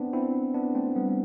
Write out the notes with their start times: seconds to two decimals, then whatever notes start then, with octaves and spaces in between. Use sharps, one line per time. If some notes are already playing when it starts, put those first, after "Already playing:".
Already playing: B3 C4 D4
0.13 C4 E4
0.54 B3 D4
0.75 A3 C4
0.96 G3 B3
1.09 B3